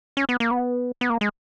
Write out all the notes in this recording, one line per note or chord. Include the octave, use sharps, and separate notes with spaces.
C#4
B3
A#3
B3
B3
A#3
G#3